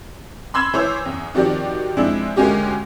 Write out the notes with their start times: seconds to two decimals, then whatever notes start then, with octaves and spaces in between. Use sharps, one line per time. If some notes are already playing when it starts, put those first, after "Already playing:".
0.54 B5 C6 E6 G#6 E7
0.73 E3 C5 C#5 D6 E6
1.05 E2
1.34 D#3 F3 C4 F#4 G4 D5
1.97 F3 G#3 C4 D4 E4
2.36 D2 G#3 A#3 C#4 F#4 G4